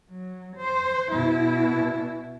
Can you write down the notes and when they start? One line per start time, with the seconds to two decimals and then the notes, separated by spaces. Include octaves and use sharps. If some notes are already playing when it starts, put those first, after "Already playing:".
0.10 F#3
0.57 C5
1.11 B2 E4